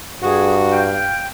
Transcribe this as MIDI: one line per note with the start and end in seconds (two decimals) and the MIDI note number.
0.23 1.12 43
0.23 0.94 66
0.23 0.56 68
0.71 1.27 77
0.71 1.27 79